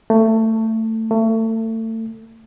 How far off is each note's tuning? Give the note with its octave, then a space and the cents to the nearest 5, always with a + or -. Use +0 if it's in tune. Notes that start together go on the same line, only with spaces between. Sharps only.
A3 +20
A3 +30